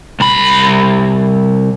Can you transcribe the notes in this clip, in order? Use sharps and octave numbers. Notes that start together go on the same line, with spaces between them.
C2 B5